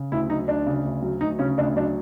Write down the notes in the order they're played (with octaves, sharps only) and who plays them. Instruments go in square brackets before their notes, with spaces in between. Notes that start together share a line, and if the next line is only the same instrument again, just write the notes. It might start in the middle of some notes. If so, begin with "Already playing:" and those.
Already playing: [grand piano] C#3
D2 E4
F#3 D#4
D2 D4
C#3
D2
F#3
D2 D#4
C#3 C#4
D2 D4
F#3 D4